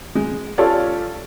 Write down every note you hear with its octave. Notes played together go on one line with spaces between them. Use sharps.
G#3
C#4 F4 G4 A4 C#5 D5